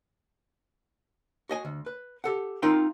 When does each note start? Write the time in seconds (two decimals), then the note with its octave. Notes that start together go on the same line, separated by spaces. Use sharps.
1.49 F#4 D#5 G#5
1.65 D2
1.86 B4
2.24 G4 A4 F#5
2.62 C4 D#4 F4 A#4 G5 C6